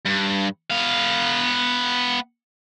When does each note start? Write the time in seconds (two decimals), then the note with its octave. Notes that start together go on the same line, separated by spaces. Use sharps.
0.05 G2
0.70 B3 F5